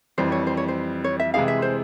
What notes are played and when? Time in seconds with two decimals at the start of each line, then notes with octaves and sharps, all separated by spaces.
0.18 F2 E3 G3 C5
0.32 C#5
0.47 C5
0.57 C#5
0.68 C5
1.04 C#5
1.20 E5
1.34 C3 E3 G#3 E4 G#4 F5
1.48 E5
1.62 C5